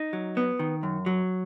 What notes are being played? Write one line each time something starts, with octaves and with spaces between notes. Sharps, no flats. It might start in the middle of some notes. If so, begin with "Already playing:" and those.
Already playing: D#4
F#3
B3
D#3
F#2
F#3